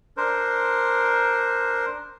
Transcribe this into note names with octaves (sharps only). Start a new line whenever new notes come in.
D4 A#4 C5